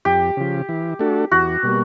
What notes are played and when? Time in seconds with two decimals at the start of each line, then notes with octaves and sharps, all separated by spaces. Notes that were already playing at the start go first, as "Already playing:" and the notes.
0.05 F2 G4
0.37 C#3 F3
0.69 E3
0.99 A3 D4 F#4 A4
1.31 E2 F#4
1.63 B2 G3 A#3